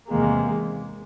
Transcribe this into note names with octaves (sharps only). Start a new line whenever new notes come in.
E2 C3 D#3 G#3 A#3